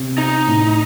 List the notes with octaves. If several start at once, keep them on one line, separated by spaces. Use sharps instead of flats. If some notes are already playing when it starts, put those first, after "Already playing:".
Already playing: C3
C4 D#4
A2